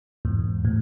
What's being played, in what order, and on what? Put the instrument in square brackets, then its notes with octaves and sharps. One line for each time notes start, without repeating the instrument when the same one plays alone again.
[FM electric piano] E2 G#2
A2